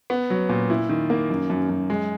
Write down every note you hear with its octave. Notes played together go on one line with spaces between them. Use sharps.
B3
F#3
A#2
E4
D#3
A#3
F#2
F#2
F#2
G#3